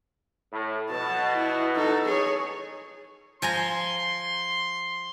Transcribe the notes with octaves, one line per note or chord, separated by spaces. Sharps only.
A2
B2 A5
E4
D#4 A4
G#4 C#5
F3 G#5 A#5 C6